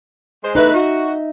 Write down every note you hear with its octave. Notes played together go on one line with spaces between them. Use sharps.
G#3 C5
E2 A3 D#4 B4 D#5 E5
F#4